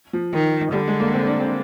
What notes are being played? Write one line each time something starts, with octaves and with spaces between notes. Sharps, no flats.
F3
D#3
D3 G3
G#3
A#3
C4
D4
C4